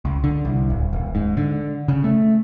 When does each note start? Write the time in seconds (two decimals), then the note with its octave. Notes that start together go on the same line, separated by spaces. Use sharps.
0.05 C#2
0.24 D3
0.45 C2
0.70 D1
0.93 D#1
1.15 G#2
1.37 D3
1.88 C#3
2.04 A3